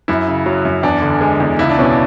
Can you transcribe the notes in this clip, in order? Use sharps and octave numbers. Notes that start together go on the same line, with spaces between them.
F#2 E4
C#3
F#3
F#2
E2 D4
D3
G#3
E2
C#2 E4
D4
B2 C#4
D4